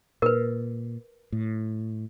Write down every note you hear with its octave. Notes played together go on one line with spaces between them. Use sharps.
A#2 A#4 B4
A2